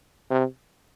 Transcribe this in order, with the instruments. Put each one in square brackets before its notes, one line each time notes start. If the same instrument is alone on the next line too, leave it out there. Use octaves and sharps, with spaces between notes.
[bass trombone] C3